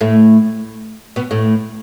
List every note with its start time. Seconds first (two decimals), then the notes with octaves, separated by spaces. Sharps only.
0.01 A2 A3
1.16 B2 B3
1.31 A2 A3